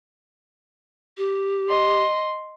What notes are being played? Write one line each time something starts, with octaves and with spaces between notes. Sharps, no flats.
G4
D#5 C6